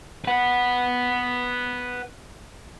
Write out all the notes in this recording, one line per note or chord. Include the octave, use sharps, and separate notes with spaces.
B4 F#5